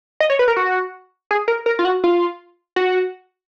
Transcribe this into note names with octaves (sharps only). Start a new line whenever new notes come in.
D#5
C#5
B4
A#4
F#4
G#4
A#4
A#4
F4
F#4
F4
F#4